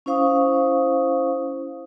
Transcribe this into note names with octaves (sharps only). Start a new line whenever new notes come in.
C#4 E4 C5 F5 C#6 D#6